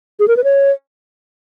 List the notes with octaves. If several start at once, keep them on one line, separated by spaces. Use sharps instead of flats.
G#4
A#4
B4
C#5